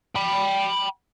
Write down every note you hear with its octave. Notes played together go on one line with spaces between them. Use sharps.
G5 B5